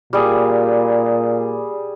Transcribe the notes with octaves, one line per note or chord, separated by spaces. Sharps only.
A#2 G3 G#4